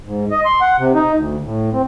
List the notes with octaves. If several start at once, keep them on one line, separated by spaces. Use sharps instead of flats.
G#2
D#5
C6
F#5
C3
D#4
D2
A2
C4